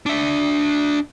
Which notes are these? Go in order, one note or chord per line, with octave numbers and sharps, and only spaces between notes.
D4 E5